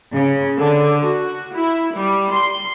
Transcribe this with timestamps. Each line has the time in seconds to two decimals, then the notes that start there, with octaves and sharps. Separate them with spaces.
0.15 C#3
0.60 D3
1.05 F#4
1.54 E4
1.96 G3
2.33 C6